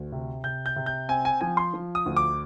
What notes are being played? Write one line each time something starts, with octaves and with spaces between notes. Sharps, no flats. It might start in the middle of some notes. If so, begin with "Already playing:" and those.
Already playing: D2
C3
C3 G6
G6
C3
G6
C4 G#5
G#5
F3 G#5
C6
F3
D#6
D2
D6